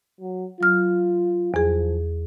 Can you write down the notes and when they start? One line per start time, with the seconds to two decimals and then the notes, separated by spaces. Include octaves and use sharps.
0.20 F#3
0.61 F#3 F4 F6
1.54 E2 F3 G#4